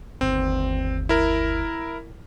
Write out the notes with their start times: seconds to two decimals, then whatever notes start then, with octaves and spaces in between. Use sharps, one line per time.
0.21 G1 D#2 C4
1.09 E4 A#4